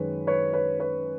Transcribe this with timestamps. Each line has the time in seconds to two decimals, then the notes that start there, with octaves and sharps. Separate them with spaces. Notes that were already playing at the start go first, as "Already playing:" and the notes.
Already playing: F#2 D#3 G#3 B4 C#5
0.27 B4 C#5
0.53 B4 C#5
0.80 B4 C#5